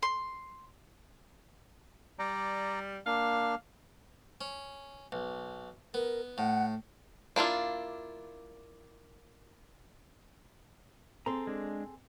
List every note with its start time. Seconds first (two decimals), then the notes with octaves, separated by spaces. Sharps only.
0.03 C6
2.19 G3 D5 A#5
3.06 A#3 D4 F5
4.41 C#4
5.12 B1
5.94 B3 A#4
6.38 A2 F#5
7.36 A#3 D4 E4 F4
11.26 C4 G#4 A4 A#5 C6
11.47 G#3 D4